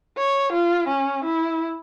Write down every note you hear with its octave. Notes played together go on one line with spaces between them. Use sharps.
C#5
F4
C#4
E4